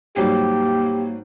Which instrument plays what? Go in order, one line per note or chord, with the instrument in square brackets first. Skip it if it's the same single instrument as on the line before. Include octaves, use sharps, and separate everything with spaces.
[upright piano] G#1 F#3 G3 [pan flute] A#3 [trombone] G4